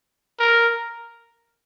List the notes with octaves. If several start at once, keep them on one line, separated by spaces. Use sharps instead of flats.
A#4